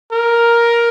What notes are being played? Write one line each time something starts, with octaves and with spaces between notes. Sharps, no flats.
A#4